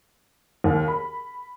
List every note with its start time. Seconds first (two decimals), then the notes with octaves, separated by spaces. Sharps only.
0.64 D#2
0.88 B5